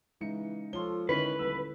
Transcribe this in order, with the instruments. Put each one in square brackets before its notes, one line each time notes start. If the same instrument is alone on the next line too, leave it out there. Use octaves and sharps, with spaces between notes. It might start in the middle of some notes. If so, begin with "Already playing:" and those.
[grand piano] C#3 D#4 C#7 [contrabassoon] E3 [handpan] G#3
[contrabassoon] F3 [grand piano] A4 C6 G7 [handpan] C#5
[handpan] D3 E4 [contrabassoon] D#3 [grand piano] C#4 [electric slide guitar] B4
[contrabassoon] D#1 [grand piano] E6